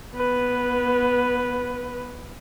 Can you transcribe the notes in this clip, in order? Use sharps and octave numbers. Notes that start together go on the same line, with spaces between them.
B3 B4